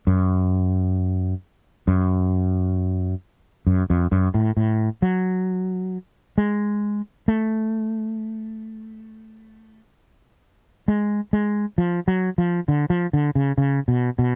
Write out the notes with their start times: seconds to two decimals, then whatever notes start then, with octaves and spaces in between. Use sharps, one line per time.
0.07 F#2
1.88 F#2
3.67 F#2
3.90 F2
4.12 F#2
4.34 A2
4.57 A2
5.02 F#3
6.38 G#3
7.28 A3
10.88 G#3
11.33 G#3
11.78 F3
12.08 F#3
12.38 F3
12.68 D3
12.90 F3
13.13 D3
13.35 C#3
13.58 C#3
13.88 B2
14.19 B2